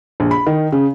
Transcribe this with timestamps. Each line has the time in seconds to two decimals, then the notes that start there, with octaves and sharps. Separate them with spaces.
0.20 A#1
0.31 B5
0.46 D#3
0.72 C#3